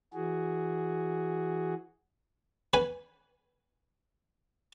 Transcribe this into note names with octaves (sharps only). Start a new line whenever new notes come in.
E3 F#4 G#4
B4 G#5